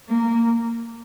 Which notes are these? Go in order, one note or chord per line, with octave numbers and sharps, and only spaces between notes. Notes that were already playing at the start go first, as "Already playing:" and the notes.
A#3